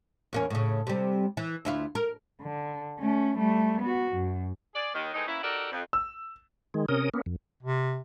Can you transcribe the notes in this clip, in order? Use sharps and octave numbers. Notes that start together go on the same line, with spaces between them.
E2 A#3 C#4
A2 C#3
C3 G3
E3
D2 E4 F4
A#4
D3
A3 C#4
G3 A3
B3 F#4
F#2
G#4 D5
D#2 D#3
E3 G#3 A3 C4 D#4
A#3 B3 C#4 E4
D#4 F#4 G4 A4 A#4 D5
F2
E6
D#3 G#3
C3 C#4 A#4 D#6
A#3 B3 C#4
F2
C3